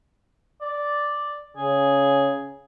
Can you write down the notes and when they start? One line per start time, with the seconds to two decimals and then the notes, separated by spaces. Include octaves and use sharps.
0.61 D5
1.57 C#3 G#4